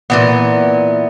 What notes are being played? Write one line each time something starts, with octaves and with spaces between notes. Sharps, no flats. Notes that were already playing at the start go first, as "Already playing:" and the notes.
A#2 E3 B3